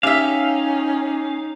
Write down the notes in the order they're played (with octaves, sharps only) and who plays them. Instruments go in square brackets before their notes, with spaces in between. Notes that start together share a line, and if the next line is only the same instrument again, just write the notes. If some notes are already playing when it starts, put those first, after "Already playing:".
[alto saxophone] C#4 [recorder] D#4 [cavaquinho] G4 E5 [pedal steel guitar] F5